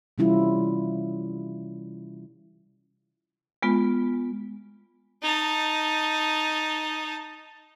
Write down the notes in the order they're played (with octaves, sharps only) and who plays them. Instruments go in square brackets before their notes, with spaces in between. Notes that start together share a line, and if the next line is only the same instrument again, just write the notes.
[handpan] C3 E3 G3 C#4 E4 F4
[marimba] G#3 B3 F4
[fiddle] D#4 A5